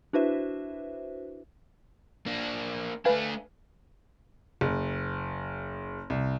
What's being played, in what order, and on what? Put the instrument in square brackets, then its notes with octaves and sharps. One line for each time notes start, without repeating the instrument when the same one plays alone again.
[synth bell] D4 E4 F#4 B4 C5 E5
[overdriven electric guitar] A#3 D4
[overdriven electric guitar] A3 D4 [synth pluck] B4 F5 G#5
[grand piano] F#1
C2